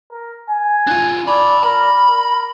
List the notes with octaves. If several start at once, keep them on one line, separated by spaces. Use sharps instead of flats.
A#4
G#5
D4 F4
D5 A5 B5
A#4 B5
A#4